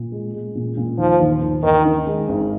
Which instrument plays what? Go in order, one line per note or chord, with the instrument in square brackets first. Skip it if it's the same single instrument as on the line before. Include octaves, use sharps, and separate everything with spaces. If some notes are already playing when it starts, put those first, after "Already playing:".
Already playing: [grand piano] A#2
G#3
G#3
A#2
A#2
[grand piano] D#2 [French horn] F3
[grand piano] D#2
D#2
[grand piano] D#2 [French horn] D#3
[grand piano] D#3
G#3
G#1